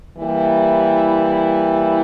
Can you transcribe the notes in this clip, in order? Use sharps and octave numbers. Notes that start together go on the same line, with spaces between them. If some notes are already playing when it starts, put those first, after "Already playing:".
E3 G3 A#3 E4